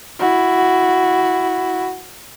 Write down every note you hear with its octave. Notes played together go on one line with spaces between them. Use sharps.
E4 F#4